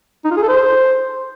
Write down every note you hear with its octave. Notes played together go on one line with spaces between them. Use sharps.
D#4
F4
G#4
A4
C5